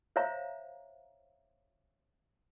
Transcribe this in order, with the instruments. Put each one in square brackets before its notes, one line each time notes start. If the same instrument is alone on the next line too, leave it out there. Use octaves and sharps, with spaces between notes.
[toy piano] C5 C#5 E5 F5 A#5